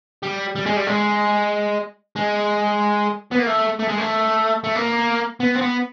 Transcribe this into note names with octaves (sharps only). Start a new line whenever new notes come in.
G3
G3
G#3
G3
G#3
G#3
B3
A#3
A3
A3
G#3
A3
A3
A#3
B3
C4
B3